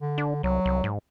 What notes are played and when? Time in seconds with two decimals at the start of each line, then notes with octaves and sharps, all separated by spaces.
0.01 D3
0.18 D4
0.43 C2 F#3
0.66 C2
0.84 G#2